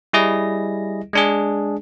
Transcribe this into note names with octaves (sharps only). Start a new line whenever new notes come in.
G3 E4 G#4 D#5 A#6
G#3 D4 G#4